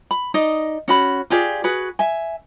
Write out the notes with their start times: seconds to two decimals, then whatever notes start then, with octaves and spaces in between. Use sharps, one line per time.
0.11 B5
0.34 D#4 D5 D#5
0.88 C#4 F#4 B5
1.30 F4 G4 G#4 D5
1.64 F#4 G#4 B4
1.99 E5 G#5